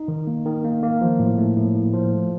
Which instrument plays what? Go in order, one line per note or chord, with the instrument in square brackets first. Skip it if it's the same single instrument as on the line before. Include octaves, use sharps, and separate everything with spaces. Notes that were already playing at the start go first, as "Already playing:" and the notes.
Already playing: [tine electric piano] D#4
D#3
A#3
D#3
A#3
A#3
F3
A2
A3
A2
A2
F3
A3